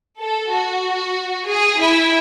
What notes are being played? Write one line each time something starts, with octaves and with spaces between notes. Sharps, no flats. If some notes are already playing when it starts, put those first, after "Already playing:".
A4
F#4
G#4
E4